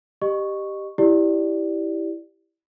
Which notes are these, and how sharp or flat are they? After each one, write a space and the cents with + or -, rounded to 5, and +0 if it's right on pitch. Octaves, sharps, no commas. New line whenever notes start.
G4 +0 D#5 -30 C#6 +0
E4 +0 G4 +0 D5 +0